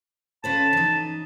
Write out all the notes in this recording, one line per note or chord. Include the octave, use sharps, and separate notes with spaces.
C#3 B4 C5 A5
E3 D#4